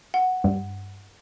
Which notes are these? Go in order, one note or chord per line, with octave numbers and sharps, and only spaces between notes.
F#5
G2